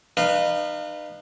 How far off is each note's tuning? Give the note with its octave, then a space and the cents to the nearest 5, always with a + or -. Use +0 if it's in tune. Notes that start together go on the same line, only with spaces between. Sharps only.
D#4 -40 B4 -15 F5 -5